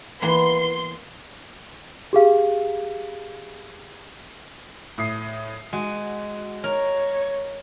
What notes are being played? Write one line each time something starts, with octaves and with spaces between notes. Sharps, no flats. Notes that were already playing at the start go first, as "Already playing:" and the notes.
E3 A#3 B3 C6
G4 G#4 F5
A2 D#6 C7
G#3 F#4
A#4 C#5